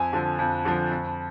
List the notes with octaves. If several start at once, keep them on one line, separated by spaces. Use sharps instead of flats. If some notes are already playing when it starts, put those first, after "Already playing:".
Already playing: F2 G#5
D3 F3
F2
D3 F3
F2